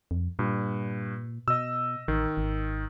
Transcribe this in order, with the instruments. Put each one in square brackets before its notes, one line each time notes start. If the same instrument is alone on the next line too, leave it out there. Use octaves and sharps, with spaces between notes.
[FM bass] F2
[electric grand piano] G2 [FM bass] A#2
[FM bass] B2 [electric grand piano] D#5 E6
[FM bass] A1 [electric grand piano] D#3
[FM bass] G#1